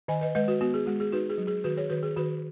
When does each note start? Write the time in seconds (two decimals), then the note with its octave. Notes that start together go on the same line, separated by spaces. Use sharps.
0.08 D#3 D#5 G#5
0.21 B4 D#5
0.35 G#3 B4 D#5
0.48 F#4 B4
0.61 B3 F#4
0.74 G#4
0.86 G#3 F#4
1.00 G#4
1.12 D#4 F#4 B4
1.30 G#4
1.38 F#3
1.47 G#4
1.64 D#3 F#4 B4
1.77 G#4 C#5
1.90 D#3 F#4 B4
2.03 G#4
2.16 D#3 F#4 B4